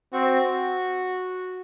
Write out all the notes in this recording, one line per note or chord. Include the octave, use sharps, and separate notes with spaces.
C4 F#4